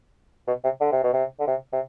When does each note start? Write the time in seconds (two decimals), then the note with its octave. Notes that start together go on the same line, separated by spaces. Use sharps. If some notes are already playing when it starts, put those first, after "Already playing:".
0.47 B2
0.64 C3
0.81 D3
0.92 C3
1.03 B2
1.13 C3
1.40 D3
1.47 C3
1.73 C3